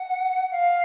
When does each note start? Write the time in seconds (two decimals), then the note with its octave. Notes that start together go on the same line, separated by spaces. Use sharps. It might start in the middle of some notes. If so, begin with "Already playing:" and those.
Already playing: F#5
0.51 F5